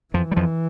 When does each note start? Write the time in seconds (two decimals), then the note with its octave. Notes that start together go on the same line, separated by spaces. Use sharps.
0.14 F2 E3 F3
0.31 G3
0.36 F2 F3